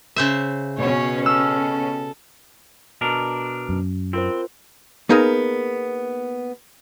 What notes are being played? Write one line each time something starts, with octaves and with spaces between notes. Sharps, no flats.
C#3 C5 E5
B2 C#4 C#5
A4 E6 F6
B2 D4 A#4
F#2
C4 F4 A#4 C5
A#3 B3 D#4 G#4 A#4